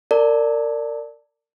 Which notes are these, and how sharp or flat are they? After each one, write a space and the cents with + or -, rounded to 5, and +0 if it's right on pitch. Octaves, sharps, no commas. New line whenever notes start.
A#4 -30 D5 +0 A5 +10